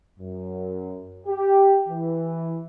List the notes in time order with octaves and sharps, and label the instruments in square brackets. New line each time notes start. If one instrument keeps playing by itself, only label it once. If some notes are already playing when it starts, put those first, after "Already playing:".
[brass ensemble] F#2
G4
E3